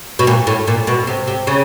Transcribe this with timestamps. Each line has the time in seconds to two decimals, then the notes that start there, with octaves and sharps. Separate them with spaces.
0.19 B2
0.27 A#2
0.47 A2
0.67 A#2
0.87 B2
1.07 C3
1.27 C3
1.47 C#3